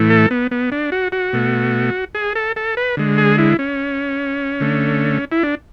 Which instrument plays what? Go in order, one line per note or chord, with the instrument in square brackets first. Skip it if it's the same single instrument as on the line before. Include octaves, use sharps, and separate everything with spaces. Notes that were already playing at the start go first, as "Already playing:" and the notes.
Already playing: [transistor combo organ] A2 E3 A3
A4
B3
B3
D4
F#4
F#4
B2 A3
G#4
A4
A4
B4
D3 G#3
G#4
E4
C#4
D3 A3
E4
D4